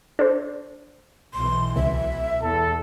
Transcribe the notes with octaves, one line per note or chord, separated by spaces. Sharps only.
D4 A4 C5
B1 B2 E3 C6
C#2 E5
E2 A4